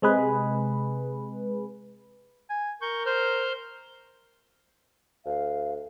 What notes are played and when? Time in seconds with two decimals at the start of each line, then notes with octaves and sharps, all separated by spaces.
0.02 C3 G#3 G#4 B4
2.50 G#5
2.82 A#4 C#6 G6
3.06 C5 F6 G6
5.25 D2 F5